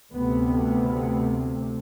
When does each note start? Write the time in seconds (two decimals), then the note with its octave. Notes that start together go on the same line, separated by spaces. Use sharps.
0.11 D2 C3 B3
0.63 B3